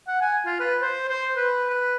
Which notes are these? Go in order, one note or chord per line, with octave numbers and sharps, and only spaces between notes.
F#5
G#5
F4
B4
C5
C5
B4
B4